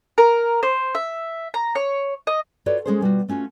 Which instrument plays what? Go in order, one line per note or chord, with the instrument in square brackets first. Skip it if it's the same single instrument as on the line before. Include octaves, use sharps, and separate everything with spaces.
[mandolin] A#4
C5
E5
A#5
C#5
D#5
[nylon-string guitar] F4 F#4 A4 B4 C#5 D5
G#3 A#3 C#4 G#4 A4 C5
B2 G3 F4 F#4
A3 C#4 F4 F#4